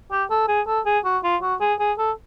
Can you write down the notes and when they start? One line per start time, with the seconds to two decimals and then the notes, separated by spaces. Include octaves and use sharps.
0.11 G4
0.31 A4
0.48 G#4
0.68 A4
0.86 G#4
1.05 F#4
1.24 F4
1.42 F#4
1.61 G#4
1.80 G#4
1.99 A4